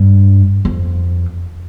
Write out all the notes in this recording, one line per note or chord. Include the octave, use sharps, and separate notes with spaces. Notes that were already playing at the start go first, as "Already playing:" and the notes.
Already playing: G2
F2